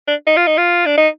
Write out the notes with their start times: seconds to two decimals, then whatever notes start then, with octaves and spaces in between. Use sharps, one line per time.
0.08 D4
0.27 D#4
0.37 F4
0.47 D#4
0.57 F4
0.86 D4
0.98 D#4